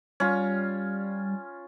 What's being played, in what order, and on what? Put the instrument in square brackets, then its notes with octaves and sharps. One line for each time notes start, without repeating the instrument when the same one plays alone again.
[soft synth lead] G3 [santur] C#4 F4